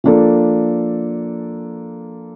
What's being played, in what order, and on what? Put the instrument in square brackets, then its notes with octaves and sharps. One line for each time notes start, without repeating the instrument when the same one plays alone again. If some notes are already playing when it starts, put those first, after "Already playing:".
[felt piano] F3 A#3 D4 A4